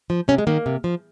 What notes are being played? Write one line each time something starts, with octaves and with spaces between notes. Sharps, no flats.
F3
C3 C#4
G#3
D#3 A#3
C3
F3